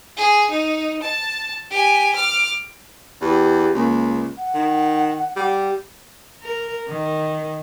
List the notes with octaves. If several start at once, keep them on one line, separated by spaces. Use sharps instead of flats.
G#4
D#4
A5
G4 G#5
D6 F6
E2 G4
C#2 A#3
F#5
D#3
G3
A#4
D#3